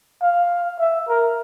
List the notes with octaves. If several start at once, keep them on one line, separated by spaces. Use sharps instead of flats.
F5
E5
A#4